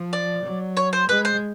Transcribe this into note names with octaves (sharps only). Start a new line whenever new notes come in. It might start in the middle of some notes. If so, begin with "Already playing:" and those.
Already playing: F3
D5
F#3
C#5
C5
G#3 B4
C5